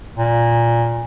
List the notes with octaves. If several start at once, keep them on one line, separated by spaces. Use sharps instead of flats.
A#2